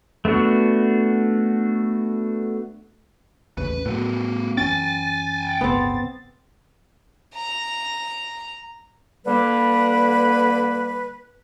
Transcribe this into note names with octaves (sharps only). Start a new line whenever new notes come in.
A3 B3 D4 F#4
A1 D#2 C#3 B4
A2 F#3 A3 B3
F#2 E3 C#4 G5 G#5 A6
D1 G1 C#3 B3 C4
A#5
D3 G3 A#3 B4